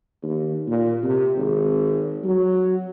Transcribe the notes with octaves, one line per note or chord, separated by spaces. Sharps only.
D#2
A#2
C3
G#1
F#3